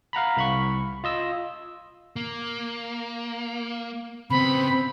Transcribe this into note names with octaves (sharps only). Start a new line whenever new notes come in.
F5 F#5 A#5 B5
C2 B5 C#6
F4 D#5 E6
A#3
C#3 B3 C4 B5